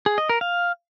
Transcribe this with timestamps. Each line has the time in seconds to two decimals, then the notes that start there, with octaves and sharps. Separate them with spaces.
0.06 G#4
0.18 D#5
0.29 A#4
0.41 F5